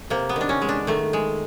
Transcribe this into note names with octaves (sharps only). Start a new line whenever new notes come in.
C3 A#3
B3
D#3 D4
C#4
G#3
D4
D#3 A3
G#3